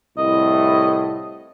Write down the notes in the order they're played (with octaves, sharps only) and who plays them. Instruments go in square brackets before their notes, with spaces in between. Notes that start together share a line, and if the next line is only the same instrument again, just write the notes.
[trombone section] C2 A2 [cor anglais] D#5